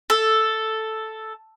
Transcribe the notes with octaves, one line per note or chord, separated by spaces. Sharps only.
A4